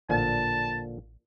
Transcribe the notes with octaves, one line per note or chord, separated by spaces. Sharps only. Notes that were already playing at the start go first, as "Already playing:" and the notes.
A1 A#2 D3 F3 A5